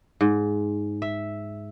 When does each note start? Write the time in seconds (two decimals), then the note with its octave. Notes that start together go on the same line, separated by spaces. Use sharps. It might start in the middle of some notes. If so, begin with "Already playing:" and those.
0.21 G#2
1.02 E5